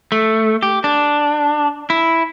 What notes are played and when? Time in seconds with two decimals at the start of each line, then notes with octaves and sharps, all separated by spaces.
0.12 A3
0.63 G4
0.84 D4
1.90 E4